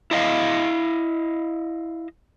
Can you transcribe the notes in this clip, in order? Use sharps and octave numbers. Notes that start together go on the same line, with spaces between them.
E4 D#5 F5